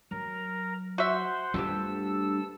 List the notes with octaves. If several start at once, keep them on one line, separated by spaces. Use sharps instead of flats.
F#3 A#4 A#5
F#4 C5 E5 F#5 C6
D2 G2 F4 G4 A4 E6